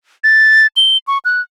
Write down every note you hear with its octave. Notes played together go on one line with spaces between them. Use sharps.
A6
G7
C#6
F#6